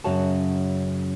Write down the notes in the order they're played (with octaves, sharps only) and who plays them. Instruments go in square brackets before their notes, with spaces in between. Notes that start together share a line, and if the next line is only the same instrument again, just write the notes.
[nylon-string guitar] F#2 C#3 F#4 C#5 A5